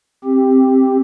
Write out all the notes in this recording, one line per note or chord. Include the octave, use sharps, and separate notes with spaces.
C4 G4